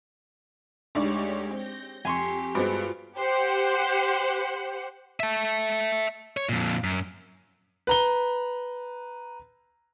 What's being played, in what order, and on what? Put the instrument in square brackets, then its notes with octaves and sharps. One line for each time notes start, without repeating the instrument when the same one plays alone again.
[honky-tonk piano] D2 D5 C#6 [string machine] G#3 G4 C#5 [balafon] D4 D#4
[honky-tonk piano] C4 [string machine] G6 A#6
[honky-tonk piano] F2 [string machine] G4 [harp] G#5 C6 C#6
[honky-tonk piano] G2 G#3 B3 [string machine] F4 [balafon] F#4 B4 C5
[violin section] G4 C5 F#5
[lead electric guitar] E5 A5
C#5
F2 A#2
F#2
[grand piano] B4 A#5 G7